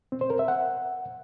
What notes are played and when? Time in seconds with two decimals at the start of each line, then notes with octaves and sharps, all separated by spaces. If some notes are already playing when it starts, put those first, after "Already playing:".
0.12 C4
0.21 C5
0.30 A#4
0.39 E5
0.48 F#5